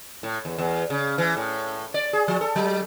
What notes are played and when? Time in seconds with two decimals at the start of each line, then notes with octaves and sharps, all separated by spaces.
0.23 A2
0.45 E2
0.58 E2
0.90 C#3
1.18 E3
1.37 A2
1.94 D5
2.13 G#4
2.28 F3
2.41 A4
2.56 F#3